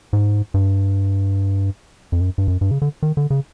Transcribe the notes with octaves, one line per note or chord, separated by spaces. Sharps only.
G#2
G2
F2
F#2
G2
F#2
G2
C#3
D3
D#3
D3
C#3